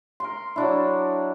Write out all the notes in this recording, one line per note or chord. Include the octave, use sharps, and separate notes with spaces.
A#4 C6
F#3 D4 E4